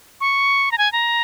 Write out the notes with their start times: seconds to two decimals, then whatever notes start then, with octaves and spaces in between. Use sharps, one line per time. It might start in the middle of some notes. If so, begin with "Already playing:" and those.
0.21 C#6
0.72 A#5
0.78 G#5
0.93 A#5